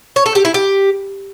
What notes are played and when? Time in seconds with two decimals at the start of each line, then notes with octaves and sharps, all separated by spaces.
0.16 C#5
0.26 A4
0.35 G4
0.45 E4
0.54 G4